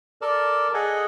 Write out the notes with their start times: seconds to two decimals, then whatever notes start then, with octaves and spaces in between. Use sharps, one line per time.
0.22 A4 A#4 D5 A5
0.74 G#4 A4 D#5 F#5 G#5